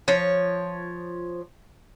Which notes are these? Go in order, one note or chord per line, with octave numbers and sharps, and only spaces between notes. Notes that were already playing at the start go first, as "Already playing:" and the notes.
F3 C#5